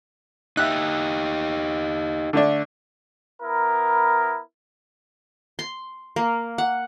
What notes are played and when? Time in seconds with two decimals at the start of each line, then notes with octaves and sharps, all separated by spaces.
0.57 D#4 G4 E5 F#6
2.33 D3 A3 D4
3.43 B3 E4 A#4
5.59 C6
6.16 A#3
6.58 F#5